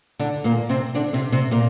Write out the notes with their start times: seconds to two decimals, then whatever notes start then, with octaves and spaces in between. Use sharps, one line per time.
0.19 D3 D4
0.44 A#2 A#3
0.69 C3 C4
0.95 D3 D4
1.13 C3 C4
1.32 C3 C4
1.51 A#2 A#3